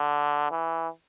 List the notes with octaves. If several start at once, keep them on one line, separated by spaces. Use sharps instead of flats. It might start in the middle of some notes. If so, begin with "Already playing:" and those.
Already playing: D3
E3